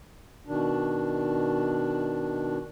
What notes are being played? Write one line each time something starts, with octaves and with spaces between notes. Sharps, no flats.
B2 D#3 D4